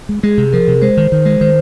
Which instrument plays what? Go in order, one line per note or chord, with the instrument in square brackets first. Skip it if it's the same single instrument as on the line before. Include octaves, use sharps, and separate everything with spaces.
[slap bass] G#3
[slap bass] G#3 [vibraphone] G#4
[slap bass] C3
[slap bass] F3 [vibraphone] A#4
[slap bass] C3
[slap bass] G#3 [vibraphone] C5
[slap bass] D#3
D#3
G#3
[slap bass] D#3 [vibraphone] C5